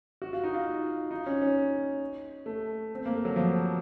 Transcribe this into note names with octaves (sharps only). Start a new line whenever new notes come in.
F#4
F4
D#4
F4
D#4
C#4
C#4
A3
C4
A#3
A3
F#3
F3